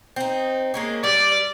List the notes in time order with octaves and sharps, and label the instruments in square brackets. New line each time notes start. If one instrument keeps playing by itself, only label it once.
[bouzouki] C4 D#4
G#3 A#3 C#4
[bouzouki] G3 [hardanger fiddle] D5